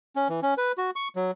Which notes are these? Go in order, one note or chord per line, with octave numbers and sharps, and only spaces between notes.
C#4
E3
C#4
B4
F#4
C#6
F#3